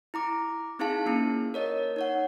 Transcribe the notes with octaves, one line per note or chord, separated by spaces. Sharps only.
E4 A#5 D6
C4 D#4 E4 G#4 F5 A5
A#3 C#4 E4
A#4 C#5 D#5
D#4 C#5 F#5